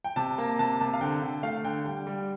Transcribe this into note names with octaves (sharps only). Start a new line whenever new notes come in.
G5
C3 A5
A#3
C3 A5
C3 A5
F5
D3 G5
D3
A3 F5
D3 G5
G3 G5
G3